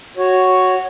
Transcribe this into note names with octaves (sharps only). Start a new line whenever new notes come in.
F#4 C#5